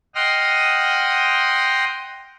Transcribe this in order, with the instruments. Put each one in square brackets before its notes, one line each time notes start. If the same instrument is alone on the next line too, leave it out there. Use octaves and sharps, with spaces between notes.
[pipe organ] D#5 F#5 G5 C6 D#6 F6